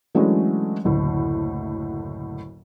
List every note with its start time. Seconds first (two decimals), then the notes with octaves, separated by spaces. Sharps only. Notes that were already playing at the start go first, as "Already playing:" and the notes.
0.15 E3 F#3 G#3 A3 C#4 D4
0.84 F#1 D2 A2